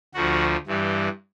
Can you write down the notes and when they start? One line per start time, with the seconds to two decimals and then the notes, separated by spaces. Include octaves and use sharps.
0.14 D2 D3 F3 F#4
0.67 G2 E3 G3